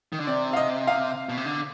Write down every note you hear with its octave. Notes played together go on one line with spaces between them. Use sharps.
D#3
D3
C3 D5
F5
D#5
F5
B2
C3
D3